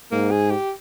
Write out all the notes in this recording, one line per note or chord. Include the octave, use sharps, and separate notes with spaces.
G#2 A#3
G#4
G4